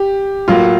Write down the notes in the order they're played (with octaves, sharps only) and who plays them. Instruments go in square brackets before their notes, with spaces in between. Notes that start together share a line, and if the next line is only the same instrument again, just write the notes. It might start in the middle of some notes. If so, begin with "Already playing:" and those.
Already playing: [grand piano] G4
[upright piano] A2 F#3 A#3 [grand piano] F4